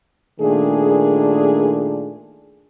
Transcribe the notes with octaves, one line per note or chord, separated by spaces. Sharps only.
A#2 D#3 A3 D4 G#4